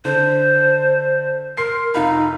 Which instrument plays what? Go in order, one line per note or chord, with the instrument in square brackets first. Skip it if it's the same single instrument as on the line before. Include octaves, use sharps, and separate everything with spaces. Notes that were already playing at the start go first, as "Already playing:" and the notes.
[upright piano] D3 [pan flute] C5
[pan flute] A#4 [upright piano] C6 C7
[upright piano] F1 F4 B5 [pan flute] D#4